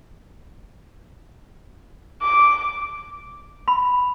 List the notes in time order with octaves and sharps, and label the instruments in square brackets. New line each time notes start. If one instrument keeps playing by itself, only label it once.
[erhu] D6
[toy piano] B5